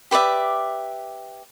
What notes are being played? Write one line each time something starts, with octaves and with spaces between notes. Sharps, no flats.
G4 B4 D5 E5